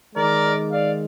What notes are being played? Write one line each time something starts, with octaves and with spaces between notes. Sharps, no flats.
D#3 G#3 D#4 A#4 D5
D5 F5